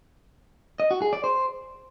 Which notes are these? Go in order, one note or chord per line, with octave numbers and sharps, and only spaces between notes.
D#5
F#4
G#4
D5
C5